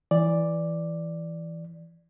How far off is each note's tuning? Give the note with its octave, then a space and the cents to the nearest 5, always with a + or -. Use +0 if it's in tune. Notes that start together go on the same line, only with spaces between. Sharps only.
E3 +0 D5 +0